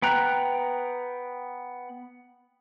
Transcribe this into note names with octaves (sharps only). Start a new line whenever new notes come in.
B3 G5 A#5 F#6